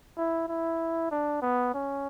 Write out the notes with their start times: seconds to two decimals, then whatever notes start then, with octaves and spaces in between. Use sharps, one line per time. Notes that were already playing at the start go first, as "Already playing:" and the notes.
0.17 E4
0.48 E4
1.11 D4
1.42 B3
1.74 C#4